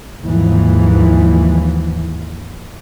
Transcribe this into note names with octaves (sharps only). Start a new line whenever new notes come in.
D#2 G#2 E3 F3